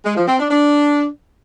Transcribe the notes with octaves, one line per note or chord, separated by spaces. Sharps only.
G#3
F3
C4
D4
D4